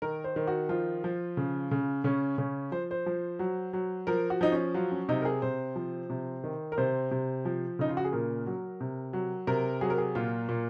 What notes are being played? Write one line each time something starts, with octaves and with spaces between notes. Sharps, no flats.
D#3 A#4
C5
D#3
F#4
F3 F4
F3
C#3
C#3
C#3 C#4
C#3 C#4
F3 C5
C5
F3
F#3
F#3
F3 A#4
F#4
F3 D#4
C#4
F#3 F4
C#4
C3 D#4
A#4
G#4
C3 C5
F3
C3
D#3
A#4
C3 C5
C3
F3
C#3 D#4
F4
F#4
G#4
A#2 A#4
F#3
C3
F#3
C3 A#4
F#3 G#4
A#4
G#4
A#2 F4
A#2